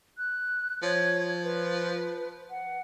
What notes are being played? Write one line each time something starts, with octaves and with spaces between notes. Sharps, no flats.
F#6
F3 C#5
B4
F#5